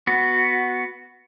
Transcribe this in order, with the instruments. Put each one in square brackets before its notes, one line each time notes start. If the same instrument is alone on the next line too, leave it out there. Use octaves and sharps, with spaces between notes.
[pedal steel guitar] B3 F#4